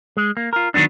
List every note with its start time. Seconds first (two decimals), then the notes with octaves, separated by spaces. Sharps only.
0.17 G#3
0.37 A#3
0.53 F4 A#4
0.74 D#3 F3 F#3 B3 D4